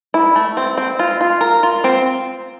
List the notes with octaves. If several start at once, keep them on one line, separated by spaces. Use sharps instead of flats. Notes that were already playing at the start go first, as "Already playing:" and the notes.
E4
A3
C4
C4
F4
F4
A#4
F4
C4